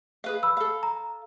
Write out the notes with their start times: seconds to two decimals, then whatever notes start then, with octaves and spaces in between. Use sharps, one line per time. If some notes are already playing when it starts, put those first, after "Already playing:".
0.24 G#4 B4 F5
0.43 B5 E6
0.57 A4 F5
0.83 A#5